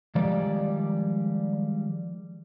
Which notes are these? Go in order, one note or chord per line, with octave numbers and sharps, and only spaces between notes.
D#3 F3 G3 G#3 D5